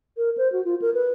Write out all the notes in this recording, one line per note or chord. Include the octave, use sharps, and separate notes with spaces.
A#4
C5
F#4
F4
A#4
B4